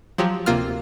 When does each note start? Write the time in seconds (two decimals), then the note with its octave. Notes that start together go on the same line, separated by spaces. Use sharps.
0.18 F3 F#3 G4
0.46 D2 C3 A#3 F4 F6